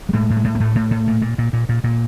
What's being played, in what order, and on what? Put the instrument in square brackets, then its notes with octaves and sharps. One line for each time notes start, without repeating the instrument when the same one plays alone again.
[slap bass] G3
A2 G#3
A2
G#3
A2
A#3
A2 A3
A2
A2
A#2
A#2
A#2
A#2
A#2
A#2